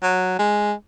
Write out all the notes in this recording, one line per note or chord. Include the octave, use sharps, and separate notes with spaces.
F#3
G#3